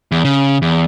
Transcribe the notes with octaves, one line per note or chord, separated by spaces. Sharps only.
E2
C#3
E2